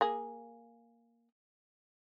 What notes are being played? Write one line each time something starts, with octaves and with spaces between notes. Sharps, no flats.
A#3 G#4